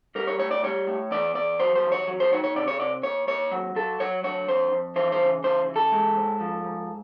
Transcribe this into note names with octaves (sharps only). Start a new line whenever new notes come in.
G3 A#4
C#5
A2 C#5
D5
G3 C#5
A2
E2 D5
E2 D5
F#3 C5
C5
E2
C#5
F#3
C5
D#3 C#5
C#5
C3 D5
C#5
C3 D5
D#2 C#5
D#2 C#5
F#3
F#3 A4
F#3 C#5
D3 C#5
F2 C5
F2
E3 C5
C5
C#3
E3 C5
E3
A4
G#3
G#2
F3
G#2